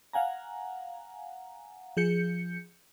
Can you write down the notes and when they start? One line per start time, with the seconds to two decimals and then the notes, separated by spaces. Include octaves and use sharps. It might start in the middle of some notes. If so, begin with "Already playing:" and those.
0.13 F5 F#5 G#5 A#5
1.97 F3 G#4 G6 C#7